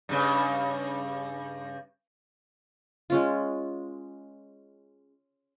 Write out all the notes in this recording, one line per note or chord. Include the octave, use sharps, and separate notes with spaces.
G2 C#3
G#3 C#4 F4